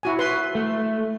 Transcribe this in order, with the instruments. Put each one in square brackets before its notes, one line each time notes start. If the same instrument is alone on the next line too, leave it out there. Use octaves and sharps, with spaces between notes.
[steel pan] E4 F#4 G#5
B4 C6
[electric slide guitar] A3